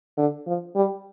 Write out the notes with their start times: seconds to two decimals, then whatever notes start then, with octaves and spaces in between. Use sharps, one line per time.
0.18 D3
0.47 F3
0.75 G3